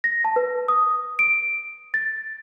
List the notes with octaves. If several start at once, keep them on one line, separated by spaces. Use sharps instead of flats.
A#6
A5
B4
D#6
D7
A6